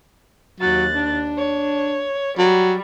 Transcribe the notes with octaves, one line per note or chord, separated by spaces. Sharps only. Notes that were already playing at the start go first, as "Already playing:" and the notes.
D#2 F#3 F#6 A6
D4
C#5
F#3 G3